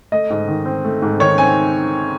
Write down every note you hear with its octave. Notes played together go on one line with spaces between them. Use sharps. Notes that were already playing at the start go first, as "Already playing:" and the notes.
A3 D#5
G#2
D#3
C4
A3
G#2
D#3 C#5
C4 G#5